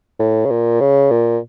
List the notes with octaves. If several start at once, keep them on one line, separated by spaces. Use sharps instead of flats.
A2
C#3
A#2
C#3
A#2